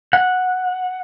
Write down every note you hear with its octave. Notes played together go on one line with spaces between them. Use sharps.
F#5